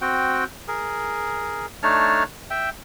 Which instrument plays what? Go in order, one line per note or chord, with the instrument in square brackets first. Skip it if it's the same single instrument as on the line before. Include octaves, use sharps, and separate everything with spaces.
[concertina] C4 F#4 G5
G#4 A#4
A3 D4 D#4 C#5 A5 F6
E5 G5